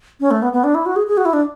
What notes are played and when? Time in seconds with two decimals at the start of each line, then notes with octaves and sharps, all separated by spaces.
0.20 C#4
0.31 A3
0.42 B3
0.53 B3
0.64 D4
0.75 E4
0.86 F#4
0.96 G#4
1.07 G#4
1.17 F#4
1.25 E4
1.33 D4